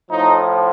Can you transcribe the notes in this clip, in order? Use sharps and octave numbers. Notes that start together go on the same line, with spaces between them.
A2 F3 D#4